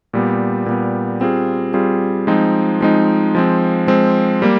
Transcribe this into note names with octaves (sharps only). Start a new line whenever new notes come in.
A#2 G3 B3
A#2 G3 B3
G3 C4 F4 G#4
G3 C4 F4 G#4
F3 G#3 C4 D#4
F3 G#3 C4 D#4
F3 G#3 C4
F3 G#3 C4
G3 A#3